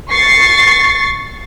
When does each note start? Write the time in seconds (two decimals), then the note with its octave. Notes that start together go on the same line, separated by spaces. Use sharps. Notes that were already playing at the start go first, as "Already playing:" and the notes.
0.11 C#6 A6 C7